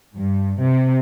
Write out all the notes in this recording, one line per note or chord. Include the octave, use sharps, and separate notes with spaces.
G2
C3